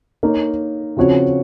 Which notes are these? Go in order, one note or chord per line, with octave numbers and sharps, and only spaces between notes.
A#3 D#4 A#4 C#5
C#3 F3 C4 F#4 C#5